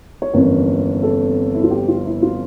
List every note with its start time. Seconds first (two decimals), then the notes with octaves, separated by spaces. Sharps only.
0.22 C#5
0.33 G1 F2 E3 A#3 C#4 A#4
1.03 A4
1.54 E4
1.64 F4
1.71 G4
1.88 F4
2.05 E4
2.22 F4